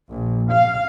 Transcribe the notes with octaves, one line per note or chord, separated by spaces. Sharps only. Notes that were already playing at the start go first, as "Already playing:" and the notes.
A#1
F5